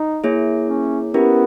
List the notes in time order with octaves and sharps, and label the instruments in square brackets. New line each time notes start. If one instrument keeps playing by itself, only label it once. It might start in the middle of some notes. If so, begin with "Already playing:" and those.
Already playing: [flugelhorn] D#4
[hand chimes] A#3 E4 G#4 C#5
[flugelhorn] C#4
[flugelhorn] B3 [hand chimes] C#4 E4 G4 A#4